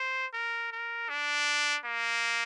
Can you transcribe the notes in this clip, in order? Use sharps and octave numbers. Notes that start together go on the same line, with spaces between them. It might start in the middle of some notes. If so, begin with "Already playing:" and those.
Already playing: C5
A#4
A#4
D4
A#3